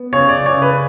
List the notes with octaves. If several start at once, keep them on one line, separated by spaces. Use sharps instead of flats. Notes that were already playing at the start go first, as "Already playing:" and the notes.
Already playing: B3
C#3 C#5
D5
C#3 C#5
B4